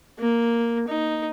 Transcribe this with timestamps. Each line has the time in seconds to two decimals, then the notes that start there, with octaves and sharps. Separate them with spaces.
0.18 A#3
0.88 D#4